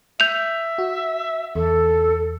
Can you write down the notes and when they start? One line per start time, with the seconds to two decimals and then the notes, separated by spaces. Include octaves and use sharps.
0.20 E5 G6 F7
0.78 F#4
1.55 E2 A4